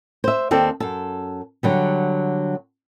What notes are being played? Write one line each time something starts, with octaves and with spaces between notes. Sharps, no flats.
C5 E5
D#2 C4 A4 D5
F#2 A4
D3 F#3 G3